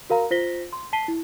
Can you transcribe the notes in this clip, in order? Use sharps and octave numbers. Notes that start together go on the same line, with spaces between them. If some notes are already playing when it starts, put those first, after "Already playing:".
F#4 A#4 F5 A#5
F4 C5 A#6 B6 G7
C6
A5 B6 C7 D#7 G7
E4